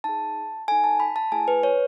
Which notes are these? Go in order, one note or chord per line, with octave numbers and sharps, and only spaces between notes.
D#4 G#4 A5
D#4 A4 G#5
A5
B5
A5
A3 E4 G#4 G#5
B4
C#5